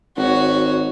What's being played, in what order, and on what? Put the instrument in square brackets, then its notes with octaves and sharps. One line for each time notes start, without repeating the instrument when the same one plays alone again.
[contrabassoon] G#1 [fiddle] F#4 C#5